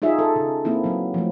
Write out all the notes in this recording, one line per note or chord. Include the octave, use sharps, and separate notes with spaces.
D#4 F4 G#4 E5
A4
C#3
A#3 C4 E4
F#3 B3
F3 A3